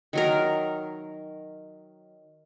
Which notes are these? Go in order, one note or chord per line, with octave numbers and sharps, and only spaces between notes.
D#3 F#3 A#4